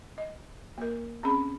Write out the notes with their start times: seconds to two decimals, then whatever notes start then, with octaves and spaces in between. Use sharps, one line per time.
0.18 D#5
0.78 A#3 A#4
1.23 C4 C#4 G#4 B5